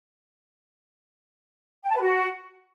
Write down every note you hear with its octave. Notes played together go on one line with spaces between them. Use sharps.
G5
A5
B4
F#4